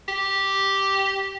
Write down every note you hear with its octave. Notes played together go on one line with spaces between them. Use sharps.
G4